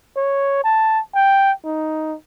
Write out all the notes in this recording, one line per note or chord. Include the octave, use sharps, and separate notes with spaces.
C#5
A5
G5
D#4